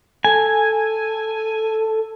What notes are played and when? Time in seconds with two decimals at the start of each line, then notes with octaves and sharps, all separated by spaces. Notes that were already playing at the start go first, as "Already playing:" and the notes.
0.25 A4 G#5